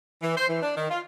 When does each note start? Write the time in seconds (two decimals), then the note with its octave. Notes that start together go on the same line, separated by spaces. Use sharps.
0.23 E3
0.37 C5
0.48 E3
0.63 D4
0.77 D#3
0.90 F4